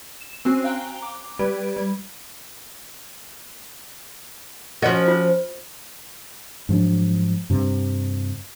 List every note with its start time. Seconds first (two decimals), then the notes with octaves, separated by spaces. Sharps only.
0.21 E7
0.45 C4 C#4 F#4 G#5 F#6 C7
0.64 F5 G5 A#5 F#6
1.02 D6
1.39 G3 G4 B4 G#6 D7
1.76 G3 G#6
4.82 F3 C#4 F#4 A#4 D#5
5.08 F4 C5
6.69 G#2 F3 F#3 D4
7.50 G2 C3